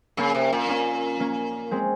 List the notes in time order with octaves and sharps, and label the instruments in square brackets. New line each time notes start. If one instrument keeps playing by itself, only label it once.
[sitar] C#3 [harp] A#3 C#4
[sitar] C3
A#2
[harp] A#3 C#4
A#3 C#4
G#3 C4